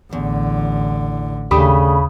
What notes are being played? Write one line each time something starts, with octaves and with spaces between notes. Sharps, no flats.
A1 E2 D3
D#2 C#3 A3 D4 G4 B5 D#6